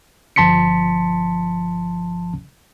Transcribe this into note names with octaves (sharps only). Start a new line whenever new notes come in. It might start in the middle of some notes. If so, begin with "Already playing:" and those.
G1 F3 A5 C6 B6 C#7